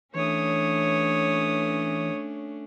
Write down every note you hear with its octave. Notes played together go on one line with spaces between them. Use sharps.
E3 A3 C#4 D4 C#5 D#6